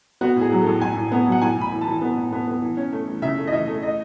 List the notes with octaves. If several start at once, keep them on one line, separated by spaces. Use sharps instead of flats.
B3 F#4
A2
G#4
F#3
A4
A2
A2 G#5
A2
B3
F#3
F#5
A2 G#5
A2 B5
E3
A5
E3
B3
A2
B3
B3
E3
C#4
A3
E3
C#3 E5
A3
D#5
E3 E5
A3
D#5